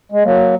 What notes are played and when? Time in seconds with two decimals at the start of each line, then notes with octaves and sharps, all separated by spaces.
0.12 G#3
0.24 F#3 A#3